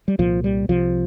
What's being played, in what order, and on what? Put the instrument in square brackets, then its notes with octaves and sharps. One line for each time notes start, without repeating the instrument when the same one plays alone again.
[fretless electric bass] G3
C2 A#2 F3
G3
C2 C3 F3